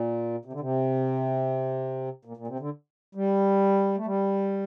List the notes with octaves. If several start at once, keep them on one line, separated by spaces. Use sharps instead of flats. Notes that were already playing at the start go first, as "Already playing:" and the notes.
Already playing: A#2
C3
D3
C3
A#2
A#2
C3
D3
G3
A3
G3